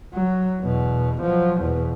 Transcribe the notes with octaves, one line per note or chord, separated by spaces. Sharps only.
F#3
E2 B2
F3 F#3
E2 B2